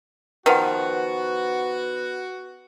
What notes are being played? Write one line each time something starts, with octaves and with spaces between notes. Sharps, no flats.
D#3 F3 B3 F#4 B4 F#5